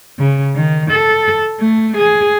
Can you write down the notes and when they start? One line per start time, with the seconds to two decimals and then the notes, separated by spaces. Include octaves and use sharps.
0.19 C#3
0.55 D#3
0.91 A4
1.61 A3
1.97 G#4